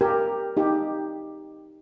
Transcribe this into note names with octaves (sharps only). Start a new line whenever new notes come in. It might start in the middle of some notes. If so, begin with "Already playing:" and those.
G4 A#4
D#4 G4